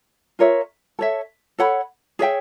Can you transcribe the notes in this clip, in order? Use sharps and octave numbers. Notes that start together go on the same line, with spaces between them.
F4 A#4 C#5 E5
A4 C#5 E5
A4 C#5 F#5 B5
G#4 C#5 E5 G5